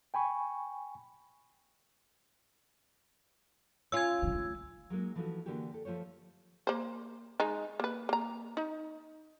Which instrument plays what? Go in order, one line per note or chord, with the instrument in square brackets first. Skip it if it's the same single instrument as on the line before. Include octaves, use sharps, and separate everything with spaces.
[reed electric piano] G5 G#5 B5 C#6
[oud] C#4 F4 [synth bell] E6 G#6
[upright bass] D3 G3
A3
[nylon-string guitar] F#3 G#3 A#3 D#4
E3 F3 A3 D4 D#4 F#4
D3 E3 A#3 D4 F#4 G4
G4 A4
F3 A3 F4 C5 C#5
[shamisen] A#3 C5
G#3 D#4
A#3 B4
A#3 A#5
D#4